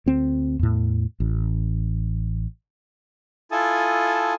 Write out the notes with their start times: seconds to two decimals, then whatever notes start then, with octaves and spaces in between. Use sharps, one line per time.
0.06 D2 C4
0.59 E2 A2
1.20 A1
3.51 E4 F4 A4 G#5 A5 D#6